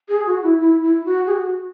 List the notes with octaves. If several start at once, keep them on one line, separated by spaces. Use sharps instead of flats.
G#4
F#4
E4
E4
E4
F#4
G#4
F#4